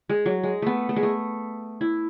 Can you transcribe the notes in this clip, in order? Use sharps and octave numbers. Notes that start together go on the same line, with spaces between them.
G#3
F#3
G#3
A3 B3
A3
G#3
A3
E4